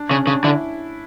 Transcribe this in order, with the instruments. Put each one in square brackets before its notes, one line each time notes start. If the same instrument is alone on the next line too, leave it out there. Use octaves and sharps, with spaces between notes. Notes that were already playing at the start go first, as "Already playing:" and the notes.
Already playing: [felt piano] D4
[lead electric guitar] C#3 [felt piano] C#4
[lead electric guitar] C#3 [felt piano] D4
[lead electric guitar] D3 [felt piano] E4